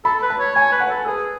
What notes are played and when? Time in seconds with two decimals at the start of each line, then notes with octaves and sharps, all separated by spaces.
0.05 A4 B5
0.22 B4
0.30 A5
0.39 C#5
0.55 C#5 G#5
0.72 B4
0.80 F#5
0.90 A4
1.06 G#4 B4